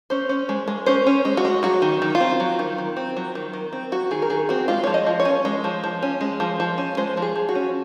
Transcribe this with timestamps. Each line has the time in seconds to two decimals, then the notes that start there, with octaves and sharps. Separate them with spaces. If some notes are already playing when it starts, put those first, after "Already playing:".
0.10 C#4 C5
0.29 C#4
0.49 G#3
0.68 G#3
0.86 C#4 C5
1.07 C#4
1.25 G#3
1.37 F#4
1.45 G#3
1.63 F#3 F#4
1.82 D#3
2.02 D#3
2.15 F4
2.20 C4
2.40 F#3
2.59 D#3
2.78 D#3
2.97 C4
3.17 F#3
3.35 D#3
3.53 D#3
3.73 C4
3.92 F#3 F#4
4.11 D#3 G#4
4.22 A#4
4.30 D#3 G#4
4.49 C4 F#4
4.68 G#3 F4
4.84 F3 C#5
4.94 D#5
5.06 F3
5.20 C#5
5.25 C#4
5.45 G#3
5.64 F3
5.84 F3
6.03 C#4
6.21 G#3
6.40 F3
6.60 F3
6.78 C#4
6.97 G#3 C5
7.17 F3
7.22 G#4
7.36 F3
7.49 F#4
7.55 C#4